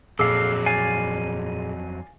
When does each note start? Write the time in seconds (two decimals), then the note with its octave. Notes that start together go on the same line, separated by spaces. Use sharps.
0.19 F2 A#2 F#3 G#4 A4 F5 D6
0.66 D5 F5 G#5